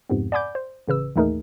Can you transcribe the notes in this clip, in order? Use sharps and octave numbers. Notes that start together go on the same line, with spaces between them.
F2 G#2 C3 B3
D5 F#5 G#5 B5 D6 G6
C5
A1 C#3 B4 E6
A1 D#2 A3 D#4 G#4 A#4